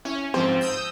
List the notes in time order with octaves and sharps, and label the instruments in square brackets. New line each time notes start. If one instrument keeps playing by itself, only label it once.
[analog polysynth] C#4 [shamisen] E4
[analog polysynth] G#2 F3 C4 [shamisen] C5
[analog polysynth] D#6 E6 G6